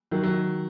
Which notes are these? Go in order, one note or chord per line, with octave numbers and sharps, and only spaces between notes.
D#3 F#3
D#3 F#3